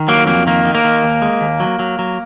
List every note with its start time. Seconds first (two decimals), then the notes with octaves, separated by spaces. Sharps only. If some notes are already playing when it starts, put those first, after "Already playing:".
Already playing: D#3
0.08 F#3 A#3
0.27 F2 A#3
0.47 D#3 A#3
0.65 D#3
0.75 A#3
0.84 D#3
1.03 D#2
1.22 G#3
1.41 D#2
1.60 F#3
1.79 F#3
1.99 F#3